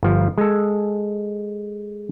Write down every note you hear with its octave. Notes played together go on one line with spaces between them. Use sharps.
G1 F3
G#3 A4